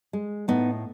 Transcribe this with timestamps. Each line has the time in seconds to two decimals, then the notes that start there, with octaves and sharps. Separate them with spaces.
0.13 G#3
0.48 A2 B3 D#4